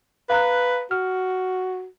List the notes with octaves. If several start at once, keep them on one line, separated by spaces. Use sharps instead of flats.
B4 F5 A#5 F#6
F#4 F6